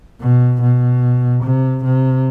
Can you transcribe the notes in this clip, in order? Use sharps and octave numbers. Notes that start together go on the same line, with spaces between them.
B2
B2
C3
C3